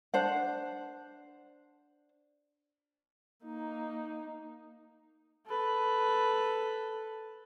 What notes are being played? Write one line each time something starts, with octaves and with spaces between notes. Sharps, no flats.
D4 C5 F#5
A#3 D#4
A4 B4